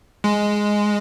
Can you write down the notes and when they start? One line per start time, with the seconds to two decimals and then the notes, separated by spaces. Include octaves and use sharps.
0.24 G#3